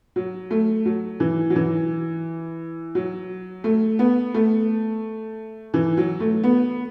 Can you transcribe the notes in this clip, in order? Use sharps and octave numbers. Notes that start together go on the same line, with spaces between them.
F#3
A3
F#3
E3
F#3
E3
F#3
A3
B3
A3
E3
F#3
A3
B3